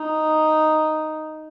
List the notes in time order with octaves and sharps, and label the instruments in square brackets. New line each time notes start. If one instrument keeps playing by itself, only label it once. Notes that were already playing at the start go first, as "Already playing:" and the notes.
Already playing: [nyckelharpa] D#4